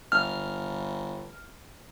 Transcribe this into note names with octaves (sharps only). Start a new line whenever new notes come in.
G1 F6